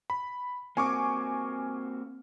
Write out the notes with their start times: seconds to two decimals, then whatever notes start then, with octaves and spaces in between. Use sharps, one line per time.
0.10 B5
0.77 A#3 C4 F#4 G#5 C#6 D6